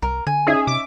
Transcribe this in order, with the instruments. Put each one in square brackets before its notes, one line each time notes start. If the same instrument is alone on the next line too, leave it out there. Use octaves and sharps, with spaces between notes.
[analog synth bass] C2 [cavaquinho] A#4
[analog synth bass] D3 [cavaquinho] G#5
[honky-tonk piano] C#4 D#4 E5 [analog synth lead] G#4
[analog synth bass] C3 [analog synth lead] D6